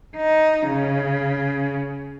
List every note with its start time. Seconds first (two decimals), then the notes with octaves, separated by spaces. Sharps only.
0.17 D#4
0.67 C#3